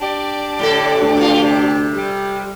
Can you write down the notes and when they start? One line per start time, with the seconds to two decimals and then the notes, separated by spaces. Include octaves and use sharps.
0.01 D4 G4 D5
0.59 A2 D3 A4
1.01 D2
1.17 A#2 F4
1.40 C3
1.93 G3